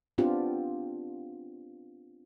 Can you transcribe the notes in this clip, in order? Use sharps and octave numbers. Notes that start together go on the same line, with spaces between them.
B3 C4 D4 F4 G4